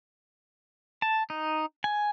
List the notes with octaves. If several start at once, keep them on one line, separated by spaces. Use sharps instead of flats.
A5
D#4
G#5